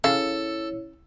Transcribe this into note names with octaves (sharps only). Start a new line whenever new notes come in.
C#3 E4 A4 C#5 F5